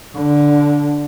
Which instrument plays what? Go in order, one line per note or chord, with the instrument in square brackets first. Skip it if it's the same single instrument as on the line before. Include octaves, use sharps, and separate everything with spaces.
[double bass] D3